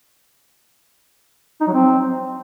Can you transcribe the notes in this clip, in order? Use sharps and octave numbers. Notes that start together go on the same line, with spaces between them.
D#4
F#3
C4